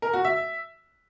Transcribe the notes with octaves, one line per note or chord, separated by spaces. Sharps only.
A#4
F#4
E5